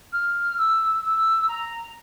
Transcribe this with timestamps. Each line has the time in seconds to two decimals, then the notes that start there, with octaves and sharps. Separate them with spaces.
0.13 F6
0.58 E6
1.03 E6
1.49 A#5